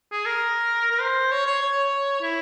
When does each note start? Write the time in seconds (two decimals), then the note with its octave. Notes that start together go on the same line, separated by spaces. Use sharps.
0.11 G#4
0.26 A#4
0.91 A#4
1.01 C5
1.31 C#5
1.46 C#5
1.61 C#5
2.21 E4